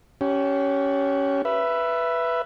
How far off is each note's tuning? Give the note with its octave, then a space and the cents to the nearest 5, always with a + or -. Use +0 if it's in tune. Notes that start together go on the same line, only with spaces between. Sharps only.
C#4 +10 G4 -20
B4 +0 E5 +15